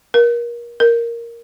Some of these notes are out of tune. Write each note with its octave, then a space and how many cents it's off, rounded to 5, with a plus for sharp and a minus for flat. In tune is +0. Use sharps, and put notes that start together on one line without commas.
A#4 +30
A#4 +0